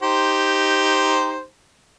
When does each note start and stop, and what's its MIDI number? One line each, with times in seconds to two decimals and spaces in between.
0.03 1.43 63
0.03 1.43 67
0.03 1.43 72